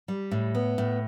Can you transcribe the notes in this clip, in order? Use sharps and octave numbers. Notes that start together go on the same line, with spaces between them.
G3
A2
B3
A2